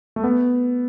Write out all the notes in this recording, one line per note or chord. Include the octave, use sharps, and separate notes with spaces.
A3
B3